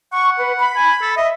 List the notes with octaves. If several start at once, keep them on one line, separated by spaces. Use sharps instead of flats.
F#5 C#6
B4
B5
G#5
A4
D#5 E5